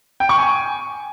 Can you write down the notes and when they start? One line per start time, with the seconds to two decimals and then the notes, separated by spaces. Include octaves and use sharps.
0.20 G5
0.29 C#6
0.38 G#5